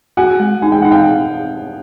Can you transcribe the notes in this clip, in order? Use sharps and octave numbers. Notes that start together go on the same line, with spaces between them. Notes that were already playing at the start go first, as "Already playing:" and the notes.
F#4 F#5 G#5
G#3
D#4 G#5
G5
D#4 F#5
F5 G5